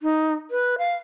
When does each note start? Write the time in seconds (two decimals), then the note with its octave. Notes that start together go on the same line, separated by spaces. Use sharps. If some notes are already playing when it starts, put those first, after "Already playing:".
0.03 D#4
0.51 B4
0.78 F5